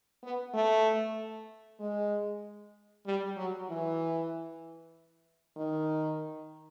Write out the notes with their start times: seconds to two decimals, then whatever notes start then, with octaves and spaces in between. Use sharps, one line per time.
0.24 B3
0.54 A3
1.80 G#3
3.06 G3
3.37 F#3
3.70 E3
5.57 D#3